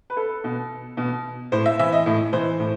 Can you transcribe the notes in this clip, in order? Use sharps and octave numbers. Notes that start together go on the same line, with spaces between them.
B4
A4
B2
B2
A2 C5
E5
E3 E5
D#5
A2
E3 C5
A2